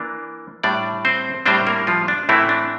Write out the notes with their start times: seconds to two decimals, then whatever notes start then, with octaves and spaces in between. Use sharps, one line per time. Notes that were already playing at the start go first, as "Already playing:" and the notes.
Already playing: E3 A#3 D4
0.63 A2 G3 D4 D5
1.05 C4 C5
1.46 A2 G3 C4 D4 C5
1.67 A#3 A#4
1.87 F3 F4
2.08 D4
2.29 A2 E3 A3 C4 E4
2.49 D4